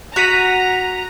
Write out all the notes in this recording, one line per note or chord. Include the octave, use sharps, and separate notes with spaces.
F#4 A#5 F#6 B6 D#7